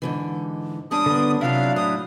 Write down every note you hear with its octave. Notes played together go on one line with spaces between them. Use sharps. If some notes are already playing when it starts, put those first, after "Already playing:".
G#2 D3 E3
G3 C#4 D4 D#6
D3 B3
C3 F#3 D4 E4 F4 F5
A2 D#6